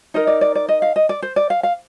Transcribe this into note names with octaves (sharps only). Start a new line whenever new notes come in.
D#4 A#4 D#5
D5
D5
D5
D#5
F5
D#5
D5
C5
D5
F5
F5